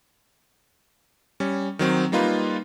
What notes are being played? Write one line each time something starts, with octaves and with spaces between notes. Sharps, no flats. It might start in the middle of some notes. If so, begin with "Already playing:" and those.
G3 C#4
D#3 F#3 C4
G3 A#3 D#4 F4 B4